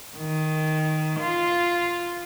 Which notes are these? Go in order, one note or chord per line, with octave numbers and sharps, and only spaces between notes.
D#3
F4